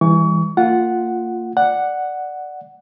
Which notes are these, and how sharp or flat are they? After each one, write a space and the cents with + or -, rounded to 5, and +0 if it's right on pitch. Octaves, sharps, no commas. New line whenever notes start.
E3 +0 G3 +45 C#6 +35
A#3 -30 F4 +0 F#5 +0
D5 +5 F#5 +0